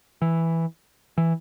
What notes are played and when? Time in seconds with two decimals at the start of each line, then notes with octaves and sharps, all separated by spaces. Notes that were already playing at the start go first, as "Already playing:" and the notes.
0.22 E3
1.18 E3